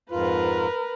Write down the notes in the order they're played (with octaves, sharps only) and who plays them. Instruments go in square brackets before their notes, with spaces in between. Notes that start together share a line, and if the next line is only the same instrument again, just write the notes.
[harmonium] F2 G#2 F4 [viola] A#4 B4